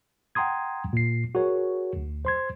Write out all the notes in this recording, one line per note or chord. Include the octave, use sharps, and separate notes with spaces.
F#5 G5 A#5 C6 D#6 G#6
A#2 C7
F#4 G#4 A#4 C#5
D2
C5 C6 G#6